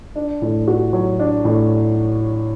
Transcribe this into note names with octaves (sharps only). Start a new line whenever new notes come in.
D4
A2
F#4
F#3
D4
A2